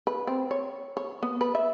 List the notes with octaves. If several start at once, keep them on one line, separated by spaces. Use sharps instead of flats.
B4
C4
C#5
C#5
B3
B4
E5